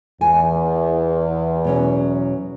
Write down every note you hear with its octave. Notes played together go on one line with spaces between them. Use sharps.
E2 G#5
B2 F#3 C#4